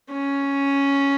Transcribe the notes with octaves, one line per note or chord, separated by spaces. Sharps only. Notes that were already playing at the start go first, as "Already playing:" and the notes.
C#4